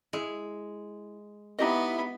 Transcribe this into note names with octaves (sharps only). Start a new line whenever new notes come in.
G#3 E4
B3 D#4 E4 G4 D#5 B5